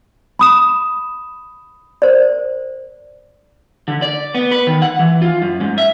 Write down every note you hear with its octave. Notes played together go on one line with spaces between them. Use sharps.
B5 D#6 E7
A#4 C5 D5
D3
D5
B3
B4
D#3
F#5
E3
F4
F#2
G#2
E5